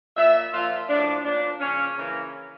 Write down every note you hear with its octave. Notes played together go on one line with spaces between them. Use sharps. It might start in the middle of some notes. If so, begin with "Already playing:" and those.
A#2 F3 E5
A#2 F3 F4
A2 F3 D4
A#2 F3 D4
C#3 F3 C#4
C#3 E3 A#3